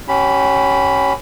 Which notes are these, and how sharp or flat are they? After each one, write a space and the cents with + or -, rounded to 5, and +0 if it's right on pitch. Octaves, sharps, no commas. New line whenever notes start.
C#4 +0 G4 -35 B5 +0